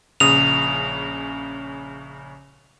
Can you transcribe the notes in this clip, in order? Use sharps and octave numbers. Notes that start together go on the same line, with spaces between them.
A#1 C#3 D#6 F7